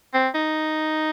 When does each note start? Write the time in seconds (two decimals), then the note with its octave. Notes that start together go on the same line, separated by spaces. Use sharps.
0.14 C4
0.35 D#4